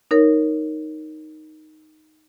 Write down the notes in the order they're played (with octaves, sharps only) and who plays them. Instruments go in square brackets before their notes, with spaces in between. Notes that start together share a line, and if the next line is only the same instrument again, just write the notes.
[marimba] D#4 A#4 C#5